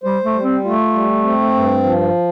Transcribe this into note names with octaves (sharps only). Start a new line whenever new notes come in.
G3 C5
A3
G3
C4
A3 F4
G3
C4
G2
F3